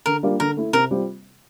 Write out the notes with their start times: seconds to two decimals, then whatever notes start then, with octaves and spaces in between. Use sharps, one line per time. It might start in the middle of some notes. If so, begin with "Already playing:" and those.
0.06 D3 A#4
0.23 G3 A#3 D4 F4
0.40 D3 A#4
0.57 A3 E4
0.73 C3 A#4
0.91 G3 C4 F4